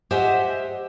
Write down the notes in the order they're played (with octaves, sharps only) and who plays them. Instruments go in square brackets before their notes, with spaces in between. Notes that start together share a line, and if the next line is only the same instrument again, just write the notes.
[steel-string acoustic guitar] G4 C5 D#5 E5 F#5 G#5